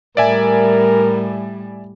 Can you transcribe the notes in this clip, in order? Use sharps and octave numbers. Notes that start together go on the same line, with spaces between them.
A2 G3 A#4 D5 E5 G#5